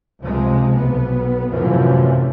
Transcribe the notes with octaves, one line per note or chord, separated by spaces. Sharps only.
C#2 C3 F3 G#3
B1 B3
F#2 A2 C3 E3 F3